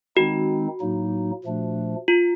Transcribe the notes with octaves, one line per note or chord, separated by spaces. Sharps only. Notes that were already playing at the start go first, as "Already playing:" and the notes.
D#3 G#3 C4 D#4 F#4
A2 F#3 A#3 D#4
A#2 F3 A3 D4
F4